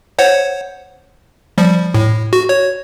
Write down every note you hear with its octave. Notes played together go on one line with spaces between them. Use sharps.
C5 C#5 F#5
F3 G3
A2
F#4
C#5